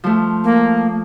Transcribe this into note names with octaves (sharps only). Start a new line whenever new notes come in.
F3 A3
A#3